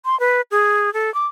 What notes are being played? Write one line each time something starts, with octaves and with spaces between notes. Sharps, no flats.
C6
B4
G#4
A4
D6